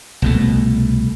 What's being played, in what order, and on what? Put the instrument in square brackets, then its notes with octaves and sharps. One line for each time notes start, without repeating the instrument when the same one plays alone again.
[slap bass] C2 B2 A3